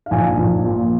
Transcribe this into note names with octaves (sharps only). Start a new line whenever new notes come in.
F5
A#1 G#5
A#1
A#2